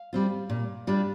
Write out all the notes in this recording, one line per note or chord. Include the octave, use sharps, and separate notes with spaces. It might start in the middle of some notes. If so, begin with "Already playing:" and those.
Already playing: F5
G3 C4 F4
A#2
G3 D4 F4